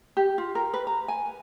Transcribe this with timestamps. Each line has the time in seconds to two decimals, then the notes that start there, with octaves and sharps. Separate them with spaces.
0.17 G4
0.38 F4
0.55 A#4
0.74 B4
0.87 A#5
1.08 G#5